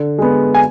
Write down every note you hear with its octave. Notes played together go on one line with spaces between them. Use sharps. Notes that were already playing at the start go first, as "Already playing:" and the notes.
Already playing: D3
G#3 B3
G#5